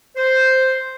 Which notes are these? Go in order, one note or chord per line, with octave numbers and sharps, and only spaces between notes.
C5